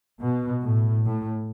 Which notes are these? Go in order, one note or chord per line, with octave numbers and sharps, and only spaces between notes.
B2
A2
A2